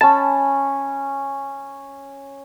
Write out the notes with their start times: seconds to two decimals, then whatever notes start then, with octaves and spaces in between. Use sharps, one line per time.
0.01 C#4 A5 B5